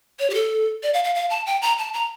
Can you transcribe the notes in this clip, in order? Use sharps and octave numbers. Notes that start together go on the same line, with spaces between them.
C#5
G4
A4
D5
F5
F5
F5
A5
G5
A#5
A5
A#5